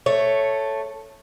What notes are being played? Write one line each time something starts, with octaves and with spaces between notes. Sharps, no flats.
A3 C#5